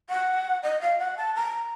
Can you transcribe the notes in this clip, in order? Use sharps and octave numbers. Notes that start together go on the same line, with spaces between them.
F#5
D#5
F5
F#5
A5
A#5